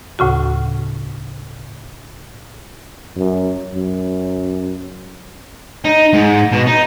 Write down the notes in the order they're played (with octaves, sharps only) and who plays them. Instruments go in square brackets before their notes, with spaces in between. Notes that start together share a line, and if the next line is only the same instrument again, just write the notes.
[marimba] D2 A2 C#3 F#4
[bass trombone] F#2
F#2
[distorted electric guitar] D#4
G#2
B2
D#4